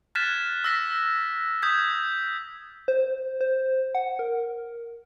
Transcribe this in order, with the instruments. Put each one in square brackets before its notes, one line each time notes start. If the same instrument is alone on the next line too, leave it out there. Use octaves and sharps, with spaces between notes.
[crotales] F6 F#6 G#6 A6 B6 E7
E6 A#6 B6
D#6 G6 G#6 B6
[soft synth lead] C5
C5
F#5
A#4